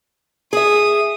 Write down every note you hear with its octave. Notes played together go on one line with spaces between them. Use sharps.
G#4 E5 D#6